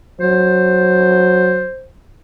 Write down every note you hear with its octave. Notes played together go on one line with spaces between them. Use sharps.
F#3 C5